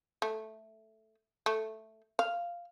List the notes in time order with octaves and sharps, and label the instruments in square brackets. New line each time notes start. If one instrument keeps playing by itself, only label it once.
[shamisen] A3
A3
F5